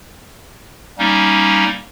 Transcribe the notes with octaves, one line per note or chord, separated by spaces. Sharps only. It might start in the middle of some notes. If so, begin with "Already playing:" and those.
G3 A#3 C#4 D#4